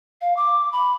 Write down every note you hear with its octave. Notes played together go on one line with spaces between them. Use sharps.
F5
D6
B5